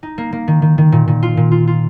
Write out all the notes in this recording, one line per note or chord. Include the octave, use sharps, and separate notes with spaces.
D#4
A#3
A#3
D#3
D#3
D#3
A#2
A#2
F4
A#2
F4
F4